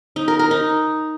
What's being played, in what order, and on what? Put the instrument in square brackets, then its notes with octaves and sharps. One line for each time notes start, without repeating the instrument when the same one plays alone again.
[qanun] D#4
A#4
A#4
D#4